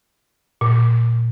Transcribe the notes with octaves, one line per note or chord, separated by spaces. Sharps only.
A#2